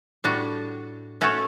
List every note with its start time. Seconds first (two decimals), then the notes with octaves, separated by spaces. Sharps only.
0.24 A2 G3 D4 F#4
1.21 A3 C#4 F#4 A4 C#5